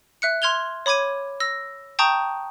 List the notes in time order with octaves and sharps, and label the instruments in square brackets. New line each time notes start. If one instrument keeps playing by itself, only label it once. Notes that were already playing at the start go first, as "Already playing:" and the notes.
[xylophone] E5 F#6 C#7
C6 F6 G#6 F7 G7
C#5 B5 D6 G#6 D#7
E6 A#6
G5 A5 A#5 C#6 D#6 G6